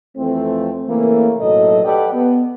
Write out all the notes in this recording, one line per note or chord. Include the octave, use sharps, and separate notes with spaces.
F2 E3 A3 C4
C#3 E3 A3 A#3
B1 A2 F#3 A4 D#5
G4 A4 B4 D5 F#5 G5
B3